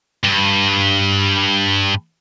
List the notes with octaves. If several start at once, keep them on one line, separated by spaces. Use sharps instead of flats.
G2